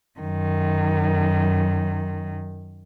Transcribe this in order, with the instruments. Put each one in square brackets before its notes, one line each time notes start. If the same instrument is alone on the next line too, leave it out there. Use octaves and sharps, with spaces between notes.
[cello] F#2 D#3